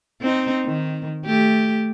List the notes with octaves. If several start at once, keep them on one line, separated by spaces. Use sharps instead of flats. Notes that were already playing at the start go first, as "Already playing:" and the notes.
C4 D#4
D#3
A3 G4